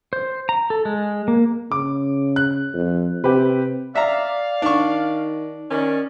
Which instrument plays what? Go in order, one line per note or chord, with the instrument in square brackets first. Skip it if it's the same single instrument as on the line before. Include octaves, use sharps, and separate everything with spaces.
[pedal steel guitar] C5
A#5
A4
G#3
A#3
[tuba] C#3 [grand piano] D6
[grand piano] F#6
[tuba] F2
[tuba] C3 [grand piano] G4 B4
[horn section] D5 F5 [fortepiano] E5 A#5
[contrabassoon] D#3 [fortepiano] D4 C#6
[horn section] D#3 C#4 D5